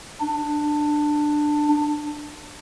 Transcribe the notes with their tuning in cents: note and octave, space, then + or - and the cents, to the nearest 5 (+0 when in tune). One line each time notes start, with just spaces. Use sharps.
D4 +15